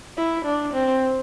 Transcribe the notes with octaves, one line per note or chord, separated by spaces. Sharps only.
E4
D4
C4